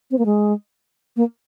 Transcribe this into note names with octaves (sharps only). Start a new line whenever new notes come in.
C4
A#3
G#3
A#3